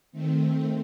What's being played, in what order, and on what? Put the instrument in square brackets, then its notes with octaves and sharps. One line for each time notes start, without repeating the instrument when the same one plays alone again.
[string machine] D#3 A3 C4